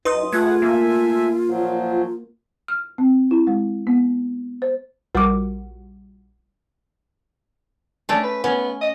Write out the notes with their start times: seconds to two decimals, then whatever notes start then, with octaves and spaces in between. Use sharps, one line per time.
0.05 F#2 D#4 B4 C6 D#6
0.33 A3 F4 G#4 B4 F#5 G#6
0.62 A3 A#3 E5 G#5
1.47 A#2 F3 F#3
2.68 F6
2.98 C4
3.31 E4
3.47 G#3
3.87 B3
4.62 C5
5.15 A#1 G3 F#4 A#4 D6
8.09 A3 C#4 D4
8.23 B4
8.44 B3 C#4
8.81 D#5